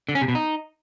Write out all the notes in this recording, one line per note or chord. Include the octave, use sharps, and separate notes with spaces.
D3
C#4
C3
B2
D#4